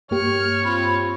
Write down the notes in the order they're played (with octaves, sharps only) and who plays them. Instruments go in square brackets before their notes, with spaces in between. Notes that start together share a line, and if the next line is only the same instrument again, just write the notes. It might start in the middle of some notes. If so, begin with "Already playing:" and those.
[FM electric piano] G2 A#3 G4 [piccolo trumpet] C#5 [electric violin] F6 C#7
[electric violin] C4 F4 [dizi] B5